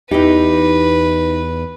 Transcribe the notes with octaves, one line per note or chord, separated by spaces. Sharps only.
E2 D#4 E4 G4 B4